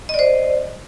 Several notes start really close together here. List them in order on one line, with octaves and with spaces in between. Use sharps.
D#5 D5 C5